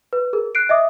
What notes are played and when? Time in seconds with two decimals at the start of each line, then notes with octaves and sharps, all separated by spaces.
0.13 B4
0.33 G#4 A#4
0.55 F#6 C7 D7
0.69 D#5 E5 D6 D#6